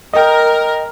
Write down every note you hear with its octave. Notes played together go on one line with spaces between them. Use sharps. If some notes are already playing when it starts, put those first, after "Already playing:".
A#4 D#5 G5